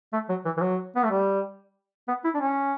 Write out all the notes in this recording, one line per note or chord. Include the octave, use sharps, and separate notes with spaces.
A3
F#3
E3
E3
F#3
B3
A3
G3
B3
E4
D4
C#4